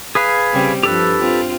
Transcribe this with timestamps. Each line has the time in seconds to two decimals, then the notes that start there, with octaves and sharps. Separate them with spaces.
0.15 G#4 B4 F5
0.53 C#3 G3 C4
0.83 G2 F3 G4 A4 B4
1.18 C4 F4